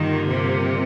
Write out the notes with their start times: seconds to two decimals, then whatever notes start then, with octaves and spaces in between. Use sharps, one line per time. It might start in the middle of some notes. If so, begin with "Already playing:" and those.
Already playing: G2 D3 D#3 G3 A#3 F4
0.27 C3